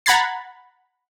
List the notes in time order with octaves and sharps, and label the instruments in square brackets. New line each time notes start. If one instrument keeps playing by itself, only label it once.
[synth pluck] F#5 A#5 B5 G#6 A6 C7